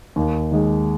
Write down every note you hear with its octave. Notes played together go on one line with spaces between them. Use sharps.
D#2
D#3 G#3